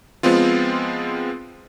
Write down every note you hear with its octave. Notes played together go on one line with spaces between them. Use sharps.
F3 G#3 B3 C4 F4